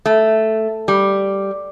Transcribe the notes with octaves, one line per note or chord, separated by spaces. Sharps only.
A3
G3